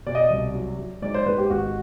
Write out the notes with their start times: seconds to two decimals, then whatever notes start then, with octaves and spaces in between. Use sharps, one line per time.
0.06 B2 D5
0.15 D#5
0.24 D5
0.30 C2
0.54 F#3
0.79 F#3
1.02 G#2 D5
1.14 C5
1.26 G#2 B4
1.38 G4
1.50 G#1 F#4